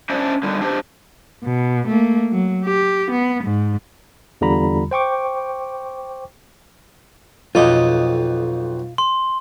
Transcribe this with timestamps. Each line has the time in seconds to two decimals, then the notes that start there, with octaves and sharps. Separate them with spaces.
0.10 C#4 D4 E4 C5 D5
0.43 D3 D#3 G3
0.61 D4 G4 C5
1.44 B2
1.88 A3 A#3
2.32 F#3
2.65 G4
3.11 B3
3.44 G#2
4.41 E2 D3 G3 F4 A#5 B5
4.91 C5 G5 C#6 D6
7.55 B1 F2 F4 D#5 D6
8.98 C6